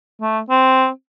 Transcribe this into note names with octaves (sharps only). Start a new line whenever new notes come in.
A3
C4